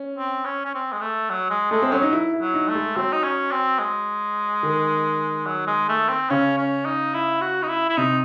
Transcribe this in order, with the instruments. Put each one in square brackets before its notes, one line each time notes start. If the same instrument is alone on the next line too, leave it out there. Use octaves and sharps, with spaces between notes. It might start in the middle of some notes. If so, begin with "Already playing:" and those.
Already playing: [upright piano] C#4
[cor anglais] C4
C#4
C#4
C4
G#3
A3
F#3
G#3
[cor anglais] G#3 [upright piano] A3
[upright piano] C4
[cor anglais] F#3 [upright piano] C#4
[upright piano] D#4
E4
E4
[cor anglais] F#3
[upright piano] D#4
[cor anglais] A3
[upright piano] G#3
[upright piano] F#3 [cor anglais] C4
[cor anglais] D#4
C#4
C4
G#3
[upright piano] D#3
[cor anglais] F#3
G#3
A3
C4
[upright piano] C#3 [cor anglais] C#4
[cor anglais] C#4
D#4
E4
F#4
D#4
E4
E4
[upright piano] C3 [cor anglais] D#4